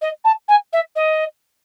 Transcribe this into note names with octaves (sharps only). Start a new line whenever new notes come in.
D#5
A5
G#5
E5
D#5